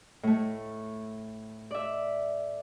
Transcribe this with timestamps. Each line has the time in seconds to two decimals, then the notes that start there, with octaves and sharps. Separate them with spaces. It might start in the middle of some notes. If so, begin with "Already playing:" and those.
0.23 A2 A3
1.71 D5 E5